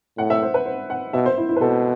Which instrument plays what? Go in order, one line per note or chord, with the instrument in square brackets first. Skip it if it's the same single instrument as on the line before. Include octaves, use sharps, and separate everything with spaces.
[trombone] A2 [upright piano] F#5
[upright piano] E5
C5
B4
C5
F#5
[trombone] B2 [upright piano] E5
[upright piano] C5
E4
E4
B4
[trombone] B2 [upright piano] A4